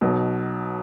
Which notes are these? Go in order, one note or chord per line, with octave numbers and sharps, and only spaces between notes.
B1 B2